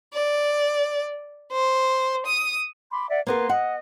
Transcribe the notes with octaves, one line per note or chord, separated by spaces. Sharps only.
D5
C5
D#6
B5 C6 D6
D5 E5 F#5
A#3 B3 A#4 C6
D#5 F#5